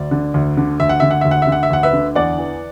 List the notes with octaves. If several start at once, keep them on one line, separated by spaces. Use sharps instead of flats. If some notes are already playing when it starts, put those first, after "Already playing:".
Already playing: D2 D5
D3
D2
D3
D2 E5
F#5
D3 E5
F#5
D2 E5
F#5
E5
D3
F#5
E5
D2 F#5
B4 E5
D3
E2 D5 F#5
E3